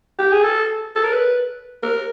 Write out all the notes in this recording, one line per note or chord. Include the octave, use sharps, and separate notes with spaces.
G4
G#4
A4
A4
A#4
B4
A#4